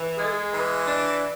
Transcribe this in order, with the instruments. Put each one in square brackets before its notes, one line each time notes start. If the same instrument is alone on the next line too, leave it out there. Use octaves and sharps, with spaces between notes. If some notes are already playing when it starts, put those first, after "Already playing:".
Already playing: [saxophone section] E3
[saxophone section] G#3 [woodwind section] G#4
[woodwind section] A4
G#4
[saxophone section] E3
[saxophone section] D4 [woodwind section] D5